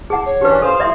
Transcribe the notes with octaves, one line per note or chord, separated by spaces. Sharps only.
G#4 F#5 A5
C#5
E3 C#4 D4 G4 B4
A4 C5 F5
F3 D5 E5 C6